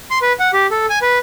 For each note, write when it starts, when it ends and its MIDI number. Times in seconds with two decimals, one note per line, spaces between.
0.11 0.18 84
0.22 0.33 71
0.40 0.51 78
0.53 0.67 67
0.71 0.86 69
0.90 0.99 80
1.02 1.19 71